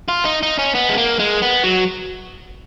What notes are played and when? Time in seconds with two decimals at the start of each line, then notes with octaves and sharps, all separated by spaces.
0.08 F4
0.25 D#4
0.43 D#4
0.59 C#4
0.75 B3
0.89 G#3
0.98 A#3
1.19 G#3
1.42 B3
1.63 F#3